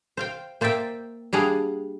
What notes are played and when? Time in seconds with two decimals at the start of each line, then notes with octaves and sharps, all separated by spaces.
0.17 C5 F5 G5
0.61 A#3 C5 D5 E5 G5
1.33 G3 D4 G#4 F5 F#5